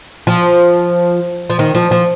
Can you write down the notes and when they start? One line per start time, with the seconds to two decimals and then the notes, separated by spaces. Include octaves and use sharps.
0.27 F3
1.50 F3
1.59 D#3
1.75 F3
1.91 F3